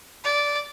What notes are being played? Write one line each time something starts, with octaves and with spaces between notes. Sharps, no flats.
D5